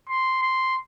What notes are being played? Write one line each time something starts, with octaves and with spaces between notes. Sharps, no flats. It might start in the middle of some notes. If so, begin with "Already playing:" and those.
C6
C6